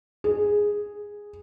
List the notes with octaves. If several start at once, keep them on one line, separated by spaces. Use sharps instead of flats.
G#4